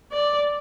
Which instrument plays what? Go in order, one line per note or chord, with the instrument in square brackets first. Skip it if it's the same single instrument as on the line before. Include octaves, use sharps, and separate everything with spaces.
[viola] D5